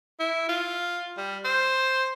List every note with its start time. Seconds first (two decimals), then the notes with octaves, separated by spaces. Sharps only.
0.19 E4
0.49 F4
1.18 G3
1.45 C5